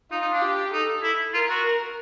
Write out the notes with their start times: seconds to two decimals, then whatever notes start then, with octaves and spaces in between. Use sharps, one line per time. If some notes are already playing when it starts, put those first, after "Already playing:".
0.11 D#4 F4
0.22 D#4
0.32 D4
0.41 G4
0.73 D#4 A4
1.03 E4
1.34 F4 A#4
1.50 F#4
1.65 A#4